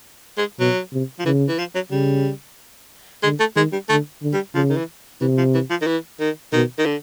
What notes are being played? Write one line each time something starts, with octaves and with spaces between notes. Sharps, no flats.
G#3
B2 F#3
C3
F3
C#3 E3
E3
F3
F#3
C#3 G3
D3 G#3
A3
D#3 G#3
G3
D3 A3
D3
G3
C#3 F3
D#3
E3
C3 E3
F3
E3
F3
D#3
E3
D#3
B2 D#3
D#3
D3